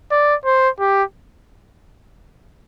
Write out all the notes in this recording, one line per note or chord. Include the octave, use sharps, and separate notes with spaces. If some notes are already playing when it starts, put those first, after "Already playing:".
D5
C5
G4